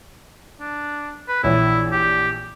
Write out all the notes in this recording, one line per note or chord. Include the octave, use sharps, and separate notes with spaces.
D4
B4
A#1 E3 E4 C#5
G4